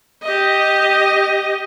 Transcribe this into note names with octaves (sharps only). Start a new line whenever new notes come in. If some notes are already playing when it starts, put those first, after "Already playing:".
G4 D#5